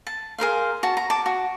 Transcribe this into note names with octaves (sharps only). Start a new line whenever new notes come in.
A5
G#4 A#4 C5 F5
F#4 A5
A#5
A5 D6
F#4